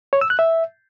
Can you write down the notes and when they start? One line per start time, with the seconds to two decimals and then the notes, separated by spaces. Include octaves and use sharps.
0.13 C#5
0.21 E6
0.30 F#6
0.39 E5